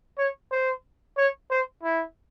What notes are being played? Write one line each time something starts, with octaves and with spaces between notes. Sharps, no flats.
C#5
C5
C#5
C5
E4